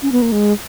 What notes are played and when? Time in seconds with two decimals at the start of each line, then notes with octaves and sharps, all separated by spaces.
0.02 C#4
0.12 B3
0.22 A#3
0.32 G#3